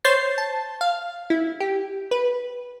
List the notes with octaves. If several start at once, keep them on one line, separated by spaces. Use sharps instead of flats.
C5 C#5 G6 A6 C7
A5
F5
E4
G4
B4